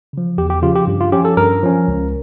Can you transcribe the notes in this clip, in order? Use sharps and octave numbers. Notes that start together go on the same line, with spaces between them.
C#3 F3
E2 G4
G4
C#3 F3 F4
G4
G2
F4
F3 C#4 G4
A4
G2 A#4
F3 C#4
C#2